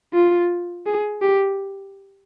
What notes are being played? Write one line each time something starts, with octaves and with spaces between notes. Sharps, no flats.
F4
G#4
G4